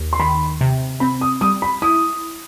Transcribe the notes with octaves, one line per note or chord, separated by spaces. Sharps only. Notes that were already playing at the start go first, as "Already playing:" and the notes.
Already playing: D#2
C6
D#3 B5
C3
C4 B5
D#6
G3 D#6
B5
E4 D#6